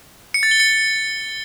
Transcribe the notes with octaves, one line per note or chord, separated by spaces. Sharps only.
C#7
A6
G7
C#7